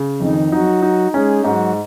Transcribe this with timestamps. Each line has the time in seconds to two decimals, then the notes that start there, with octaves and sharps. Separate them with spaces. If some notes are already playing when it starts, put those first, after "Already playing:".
Already playing: C#3
0.20 F2 D#3 D#4
0.51 F#3 D#4 F#4
0.82 D#4
1.13 G#3 C#4 G#4
1.44 G#2 F#3 F#4